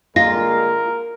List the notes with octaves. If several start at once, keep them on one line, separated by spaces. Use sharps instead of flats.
D3 G#3 A#3 F4 A#4 A#6